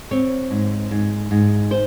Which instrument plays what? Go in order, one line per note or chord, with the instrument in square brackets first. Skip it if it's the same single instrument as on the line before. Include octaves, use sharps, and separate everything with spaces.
[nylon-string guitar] C4 C#5
G#2
G#2
G#2
C5